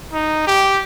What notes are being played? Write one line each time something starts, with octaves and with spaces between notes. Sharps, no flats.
D#4
G4